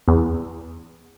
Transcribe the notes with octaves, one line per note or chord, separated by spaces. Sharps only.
E2